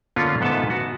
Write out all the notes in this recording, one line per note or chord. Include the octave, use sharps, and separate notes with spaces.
D3 A#3 B3 C#4 D4 F4
G#2 B3 A4 B4 E5 A5
F#4